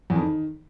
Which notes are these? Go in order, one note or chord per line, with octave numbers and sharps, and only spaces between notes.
E2
F2
D#3